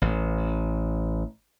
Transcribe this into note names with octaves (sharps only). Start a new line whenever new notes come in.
A1